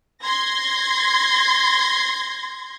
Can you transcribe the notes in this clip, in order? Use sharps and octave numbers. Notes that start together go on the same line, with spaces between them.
C6 G#6 A#6